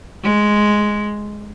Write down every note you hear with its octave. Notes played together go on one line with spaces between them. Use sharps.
G#3